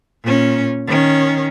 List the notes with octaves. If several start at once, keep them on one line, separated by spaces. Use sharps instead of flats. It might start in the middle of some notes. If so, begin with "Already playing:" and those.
A#2 C#4
D#3 C#4